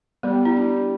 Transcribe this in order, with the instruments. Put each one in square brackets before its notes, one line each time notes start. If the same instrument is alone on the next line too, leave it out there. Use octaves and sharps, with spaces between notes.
[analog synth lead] G3 [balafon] B3
[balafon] E4
D4